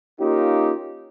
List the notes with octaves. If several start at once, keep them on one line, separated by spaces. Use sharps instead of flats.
A#3 C#4 D#4 F4 G4